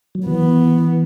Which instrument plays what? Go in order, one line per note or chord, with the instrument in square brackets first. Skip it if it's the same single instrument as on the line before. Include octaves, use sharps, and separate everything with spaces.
[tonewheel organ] F#3
[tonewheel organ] E3 [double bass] B3